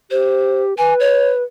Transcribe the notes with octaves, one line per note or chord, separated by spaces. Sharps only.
G4 C5
B4 G#5
C#5